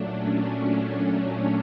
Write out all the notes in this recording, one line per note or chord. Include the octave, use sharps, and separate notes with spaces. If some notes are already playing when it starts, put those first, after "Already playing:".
Already playing: A#2 F#3 A3 D4
C#4
C#4